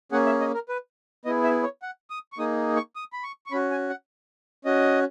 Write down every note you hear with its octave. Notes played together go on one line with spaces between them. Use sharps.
A#3 C#4 G#4 F#5
E5
D#5
A#4
B4
B3 E4 G#4 D#5
E5
C#5
F#5
D#6
C#6
A#3 D#4 G#4 D#6
C#6
D#6
B5
C#6
C#6
C#4 F#4 B5
G#5
F#5
C#4 F#4 D#5